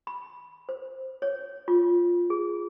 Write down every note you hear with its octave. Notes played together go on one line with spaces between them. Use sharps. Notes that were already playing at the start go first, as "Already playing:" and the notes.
B5
C5
C#5
F4
G#4